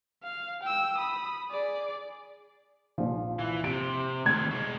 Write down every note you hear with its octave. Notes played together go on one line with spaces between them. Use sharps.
F5
G5 E6
B5 D#6
G#4 D5
A#1 F3
E3
C3 D7
A2 D#3 G#6
B2 G#3